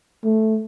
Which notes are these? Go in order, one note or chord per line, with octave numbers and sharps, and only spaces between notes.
A3